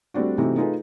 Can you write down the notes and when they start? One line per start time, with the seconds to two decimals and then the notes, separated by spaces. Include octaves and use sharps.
0.14 G3 A3 C4 D4 F#4
0.38 C3 E3 A3 C4 D#4 F#4
0.56 A3 D#4 F4 G#4 B4